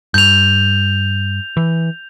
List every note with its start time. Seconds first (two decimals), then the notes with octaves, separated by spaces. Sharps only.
0.14 G2 G6 F7
1.57 E3